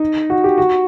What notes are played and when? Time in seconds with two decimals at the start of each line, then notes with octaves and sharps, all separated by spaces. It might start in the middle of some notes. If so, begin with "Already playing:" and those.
Already playing: D#4
0.30 F#4
0.44 G4
0.58 F#4